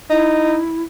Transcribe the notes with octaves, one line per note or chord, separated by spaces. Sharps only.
D#4 E4